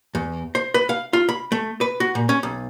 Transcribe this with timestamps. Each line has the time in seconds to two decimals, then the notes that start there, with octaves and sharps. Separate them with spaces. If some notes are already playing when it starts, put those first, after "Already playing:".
0.15 E2
0.55 C5
0.74 B4
0.89 F5
1.13 F4
1.29 B5
1.52 A3
1.81 B4
2.00 F#4
2.15 A#2
2.29 C#4
2.43 B1